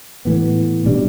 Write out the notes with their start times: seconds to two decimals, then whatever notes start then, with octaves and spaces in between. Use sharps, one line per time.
0.25 A2 E3 B3
0.86 B2 G3 D4